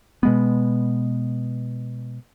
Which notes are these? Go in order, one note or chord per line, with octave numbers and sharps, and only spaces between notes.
B2 G#3 B3